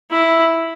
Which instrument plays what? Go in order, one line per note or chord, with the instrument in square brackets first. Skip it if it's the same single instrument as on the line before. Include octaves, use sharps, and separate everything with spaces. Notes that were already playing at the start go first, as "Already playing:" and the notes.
[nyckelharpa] E4